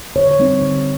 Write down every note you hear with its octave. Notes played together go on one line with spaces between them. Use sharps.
D3 C#5
G3 C4 D#4
D3